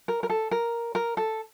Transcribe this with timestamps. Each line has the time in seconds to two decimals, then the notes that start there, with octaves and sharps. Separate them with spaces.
0.08 A#4
0.23 A#4
0.30 A4
0.51 A#4
0.95 A#4
1.17 A4